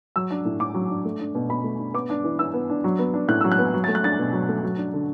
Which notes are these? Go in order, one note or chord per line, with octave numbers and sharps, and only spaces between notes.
F#3 E6
D4
A2
A2 D6
F#3
D4
A3
D4
B2
B2 B5
A3
D4
B3 D6
D4
E3
E3 E6
B3
D4
F#3
B3
D4
A2 F#6
F#3 E6
F#6
B3
F#3
A3 A6
F#6
D4 A6
B2
F#3
A3
F#3
D4
D3